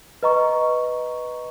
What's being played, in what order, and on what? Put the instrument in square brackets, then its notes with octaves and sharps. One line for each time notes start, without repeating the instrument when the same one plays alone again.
[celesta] B4 D#5 A#5 C#6